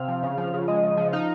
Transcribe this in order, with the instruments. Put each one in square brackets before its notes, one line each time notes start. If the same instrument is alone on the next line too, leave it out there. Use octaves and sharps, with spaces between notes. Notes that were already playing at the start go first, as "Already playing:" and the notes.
Already playing: [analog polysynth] C3 C4 [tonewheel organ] F5
[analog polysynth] F3
C#3
F3
C#3
[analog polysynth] G#3 [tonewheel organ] D#5
[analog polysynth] C#3
F3
[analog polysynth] D#4 [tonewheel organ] F5